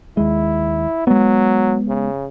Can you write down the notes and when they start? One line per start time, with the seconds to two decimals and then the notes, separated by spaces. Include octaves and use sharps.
0.17 D#2 G#3 E4
1.07 F#3 G#3 B3
1.88 C#3